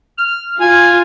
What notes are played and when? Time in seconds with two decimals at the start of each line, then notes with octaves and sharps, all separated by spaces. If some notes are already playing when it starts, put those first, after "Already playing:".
0.18 F6
0.61 F4 G#5